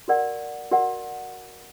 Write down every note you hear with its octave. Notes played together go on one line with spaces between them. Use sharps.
F#4 A#4 D5 F#5
F#4 A#4 D5 F#5